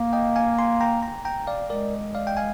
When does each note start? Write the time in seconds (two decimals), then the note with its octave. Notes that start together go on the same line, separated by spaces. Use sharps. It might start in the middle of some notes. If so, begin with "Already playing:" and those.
Already playing: A#3
0.13 D#5 G5
0.36 F5 G#5
0.59 G#5 C6
0.81 G5 A#5
1.03 G5 A#5
1.25 G5 A#5
1.47 D5 F5
1.70 G#3 A#4 D5
2.15 D5 F5
2.27 G5
2.37 F5 G#5